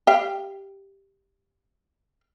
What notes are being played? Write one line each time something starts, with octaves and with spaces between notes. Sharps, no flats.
G4 F5